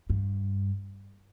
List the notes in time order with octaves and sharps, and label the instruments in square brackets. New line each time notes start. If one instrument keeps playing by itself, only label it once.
[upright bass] G2